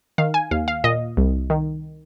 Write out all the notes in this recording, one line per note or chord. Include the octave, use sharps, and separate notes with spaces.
D#3 F5
G#5
D#2 F5
F5
A#2 D#5
C2
D#3